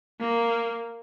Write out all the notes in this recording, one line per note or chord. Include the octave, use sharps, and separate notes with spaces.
A#3